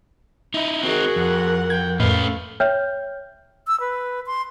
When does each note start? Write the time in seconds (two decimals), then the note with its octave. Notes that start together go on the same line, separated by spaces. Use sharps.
0.54 D#4 E4
0.83 C4 D#4 F#4 G#4 A#4 F#5
1.16 F2
1.70 G5 G#6
2.00 F2 A2 A3 C#4 B4 F5
2.60 C#5 E5 G5 F6 G6
3.67 E6
3.80 B4
4.26 C6